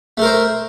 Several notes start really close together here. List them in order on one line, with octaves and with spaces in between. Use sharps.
A3 A#4 C5